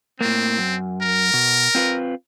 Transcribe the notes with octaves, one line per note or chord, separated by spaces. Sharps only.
A2 A#3 C4
F#2
A#4
B2
C4 F4 B4